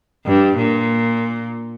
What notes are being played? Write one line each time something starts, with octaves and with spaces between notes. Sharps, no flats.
G2
A#2